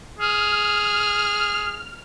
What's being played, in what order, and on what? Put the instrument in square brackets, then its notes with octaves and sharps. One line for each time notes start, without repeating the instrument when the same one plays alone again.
[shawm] G#4 [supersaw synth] F6